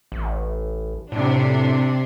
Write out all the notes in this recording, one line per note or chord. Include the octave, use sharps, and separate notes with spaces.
A1
A2 C3 D4